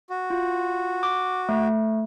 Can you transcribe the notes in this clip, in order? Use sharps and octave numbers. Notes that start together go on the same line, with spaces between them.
F#4
F4
D6
A3